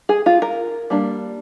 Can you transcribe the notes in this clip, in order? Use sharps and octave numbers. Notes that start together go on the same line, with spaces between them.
G#4
F4
A#4
G3 A#3 D4